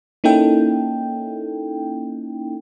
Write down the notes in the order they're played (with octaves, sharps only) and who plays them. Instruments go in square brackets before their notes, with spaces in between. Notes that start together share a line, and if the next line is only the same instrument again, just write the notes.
[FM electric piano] A#3 C#4 D#4 E4 A4 G5